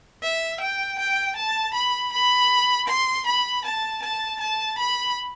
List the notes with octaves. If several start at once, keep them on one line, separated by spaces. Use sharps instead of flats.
E5
G5
G5
A5
B5
B5
C6
B5
A5
A5
A5
B5